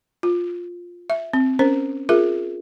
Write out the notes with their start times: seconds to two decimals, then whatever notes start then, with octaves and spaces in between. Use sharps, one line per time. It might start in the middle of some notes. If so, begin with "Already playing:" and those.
0.23 F4
1.10 E5
1.33 C4
1.59 C#4 A#4 C5
2.09 F4 G#4 A#4 E5